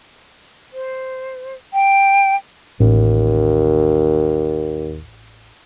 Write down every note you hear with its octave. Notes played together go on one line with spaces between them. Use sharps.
C5
G5
A1 D#2 A2 C#4